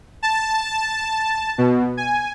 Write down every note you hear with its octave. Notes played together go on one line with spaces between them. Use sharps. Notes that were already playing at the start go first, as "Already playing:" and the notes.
A5
B2
G#5